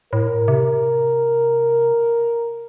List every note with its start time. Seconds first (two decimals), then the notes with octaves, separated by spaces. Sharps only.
0.13 A2 A#4
0.48 C3